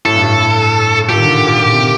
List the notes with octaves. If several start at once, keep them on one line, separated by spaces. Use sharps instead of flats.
A2 A4
G2
A2
A#2 G4
D#3
D3
D3
A#2
A#2
C3